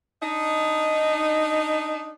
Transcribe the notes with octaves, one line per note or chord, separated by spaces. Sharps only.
D4 D#4